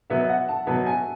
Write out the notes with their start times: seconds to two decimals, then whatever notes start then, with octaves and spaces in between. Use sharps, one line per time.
0.10 B2 F#3 B3 E5
0.29 F#5
0.48 A5
0.67 B2 F#3 B3 A5
0.86 G#5